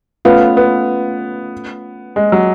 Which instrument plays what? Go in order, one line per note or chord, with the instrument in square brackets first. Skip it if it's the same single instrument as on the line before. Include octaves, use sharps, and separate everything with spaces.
[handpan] A3 C#4 F4 B4 F5 [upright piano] B3
[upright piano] B3
G#3
F#3